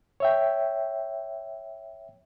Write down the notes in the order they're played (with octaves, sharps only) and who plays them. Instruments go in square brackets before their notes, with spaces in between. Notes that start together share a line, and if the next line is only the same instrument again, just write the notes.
[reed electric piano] C#5 E5 G5